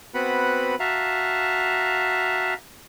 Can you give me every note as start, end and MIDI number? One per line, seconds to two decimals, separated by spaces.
0.14 0.75 59
0.14 0.75 60
0.14 0.75 66
0.14 0.75 71
0.14 0.75 78
0.14 0.75 83
0.80 2.54 66
0.80 2.54 76
0.80 2.54 77
0.80 2.54 81
0.80 2.54 82